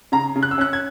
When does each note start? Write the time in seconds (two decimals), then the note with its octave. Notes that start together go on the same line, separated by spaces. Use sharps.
0.12 C#3 A#5
0.36 C#3
0.43 F#6
0.51 E6
0.58 C#4 F#6
0.73 G#6